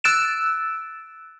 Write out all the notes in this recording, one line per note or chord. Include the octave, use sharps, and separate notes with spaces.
E6 F#6 A6 D7 E7